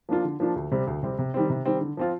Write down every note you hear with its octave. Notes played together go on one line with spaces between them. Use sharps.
F3 A#3 D4 F4
D3
F3 A#3 D4 F4
D2
C3 G3 C4
D2
C3 G3 C4
C3
D#3 G3 C4
C3
D#3 G3 C4
D3
F3 C4 F4